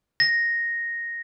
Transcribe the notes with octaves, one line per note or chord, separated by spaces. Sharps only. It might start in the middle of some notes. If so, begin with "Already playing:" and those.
A#6